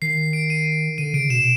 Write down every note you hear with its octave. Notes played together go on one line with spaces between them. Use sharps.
D#3 C7
D7
D#7
D3 D#7
C#3 D7
B2 E7
B2